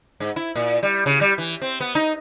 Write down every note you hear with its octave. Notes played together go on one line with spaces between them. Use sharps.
G#2
E4
A#2
G3
C#3
G3
E3
C4
B3
D#4